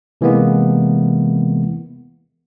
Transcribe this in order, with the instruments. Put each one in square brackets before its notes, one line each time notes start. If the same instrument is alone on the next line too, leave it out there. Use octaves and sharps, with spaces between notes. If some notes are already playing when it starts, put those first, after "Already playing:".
[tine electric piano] C3 E3 G#3 A#3 B3